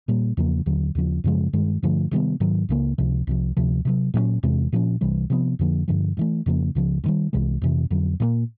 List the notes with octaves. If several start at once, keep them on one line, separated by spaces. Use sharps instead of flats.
A#2 G3 A#3
E2 C#3 F3 A#3
D#2 D3 F#3
D#2 C#3 F3
F#2 C#3 F3 G#3
G2 D#3 G#3
G2 D3 F3 A3
C3 D#3 G3 B3
G#2 D#3 F#3
C#2 C#3 F#3 A#3
C#2 C3 F3
C2 C3 F3
D2 C3 F3
C3 D#3 F#3
A#2 F#3 A#3 C#4
E2 C3 E3 G#3
A#2 F3 A3 C#4
C2 C3 E3 G3
C3 F3 G#3 B3
F2 D3 F3 A#3
G2 D3 F3
G2 E3 A3
F2 C#3 F3 A#3
C#2 C#3 F3
G2 D#3 G3
C2 C3 E3 G#3
F2 C3 E3
F2 D3 F#3
A#2 G3 A#3